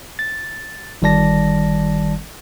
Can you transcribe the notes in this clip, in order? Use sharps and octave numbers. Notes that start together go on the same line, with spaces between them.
A6
G1 D#3 G3 D5 A5 A#6